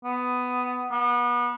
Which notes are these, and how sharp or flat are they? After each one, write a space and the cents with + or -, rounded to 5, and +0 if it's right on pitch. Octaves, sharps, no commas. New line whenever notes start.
B3 +10
B3 -30